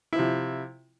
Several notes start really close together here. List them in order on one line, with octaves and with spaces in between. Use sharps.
E4 F3 C3